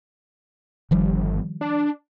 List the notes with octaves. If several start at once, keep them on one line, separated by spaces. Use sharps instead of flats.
G1 D#3 F3 G3
D4